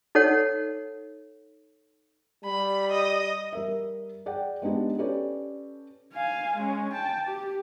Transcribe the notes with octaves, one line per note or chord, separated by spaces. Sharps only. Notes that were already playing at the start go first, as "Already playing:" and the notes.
D#4 A4 C#5 F#5
G3 B5
D#5
G3 A#4 E5
G#4 D5 F#5 G5
G#3 B3 D4 D#4 G4
C#4 G4 A4 B4 C#5 D5
F5 G#5
G#3 C#4
G5 A5
G4